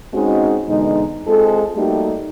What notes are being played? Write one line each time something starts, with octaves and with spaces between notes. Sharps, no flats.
G#3 C4 C#4 D#4 F#4
E2 B2 D3 G#3 D#4
G#3 C4 F4 A4
G3 A3 A#3 D#4 F#4 G4